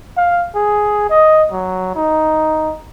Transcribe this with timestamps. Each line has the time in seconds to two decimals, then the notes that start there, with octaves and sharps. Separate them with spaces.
0.17 F5
0.55 G#4
1.10 D#5
1.52 F#3
1.95 D#4